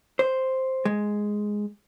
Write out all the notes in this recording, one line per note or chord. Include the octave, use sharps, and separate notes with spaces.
C5
G#3